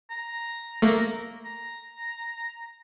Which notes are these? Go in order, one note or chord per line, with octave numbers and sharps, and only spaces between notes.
A#5
A3 A#3
A#5